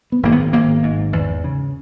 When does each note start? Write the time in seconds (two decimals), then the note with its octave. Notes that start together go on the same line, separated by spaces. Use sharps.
0.12 B3
0.23 G#1 A#3
0.32 B3
0.53 G#1 A#3
0.83 G#2
1.13 E2
1.44 C#3